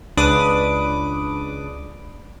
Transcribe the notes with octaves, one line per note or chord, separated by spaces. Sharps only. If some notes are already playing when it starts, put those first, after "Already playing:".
C#2 D4 B4 D6 D#6